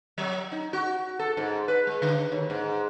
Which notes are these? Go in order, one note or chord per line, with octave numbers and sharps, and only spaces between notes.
F#3
D#4
F#4
A4
G#2
B4
G#3
D3
D#2
G#2